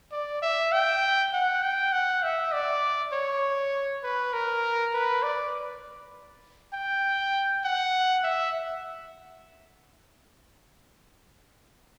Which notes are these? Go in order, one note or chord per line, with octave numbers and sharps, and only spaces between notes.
D5
E5
G5
F#5
G5
F#5
E5
D5
C#5
B4
A#4
B4
D5
G5
F#5
E5